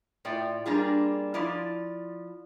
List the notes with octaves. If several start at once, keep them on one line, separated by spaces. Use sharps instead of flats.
A2 F4 D5 G5
G3 A#3 D4 F4 G#4
F3 E4 F4 D5